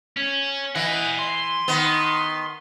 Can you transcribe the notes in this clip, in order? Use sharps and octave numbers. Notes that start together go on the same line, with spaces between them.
C#4
E3 D#5 F#5
C6
D#3 B3